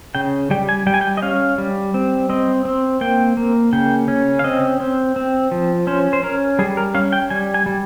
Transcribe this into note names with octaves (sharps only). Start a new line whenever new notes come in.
C#3 G5
G3 G5
G#5
G3 G5
G#5
G5
D#5
C#4 F5
G3
C4
C4 D#5
C4
A#3 G5
A#3
C#3 G5
C#4
F5
C4 D#5
C4
C4
F3
C#4 C5
C5
C#4 A#4
G3 G#4
A#4
C#4 F5
G5
G3 G#5
G#5
G3